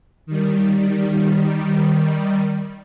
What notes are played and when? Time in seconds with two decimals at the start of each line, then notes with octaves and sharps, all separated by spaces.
0.26 D#3 G3